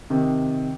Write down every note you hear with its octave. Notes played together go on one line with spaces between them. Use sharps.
C3 D#3